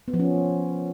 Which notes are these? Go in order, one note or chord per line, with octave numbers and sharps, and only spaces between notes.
B3
F3
C#4